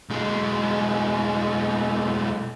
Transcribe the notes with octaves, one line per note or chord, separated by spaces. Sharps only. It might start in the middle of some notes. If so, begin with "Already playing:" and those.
B1 G#3